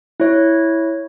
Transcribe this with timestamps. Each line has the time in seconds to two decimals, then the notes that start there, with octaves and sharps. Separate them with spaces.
0.20 E4 C#5